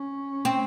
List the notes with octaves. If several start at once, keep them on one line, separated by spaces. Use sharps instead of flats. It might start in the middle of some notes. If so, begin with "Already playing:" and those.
Already playing: C#4
C4